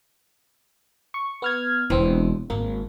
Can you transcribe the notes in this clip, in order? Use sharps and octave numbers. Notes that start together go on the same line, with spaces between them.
C#6
B3 F6 G#6
E1 E3 C4 D4
G#1 A#3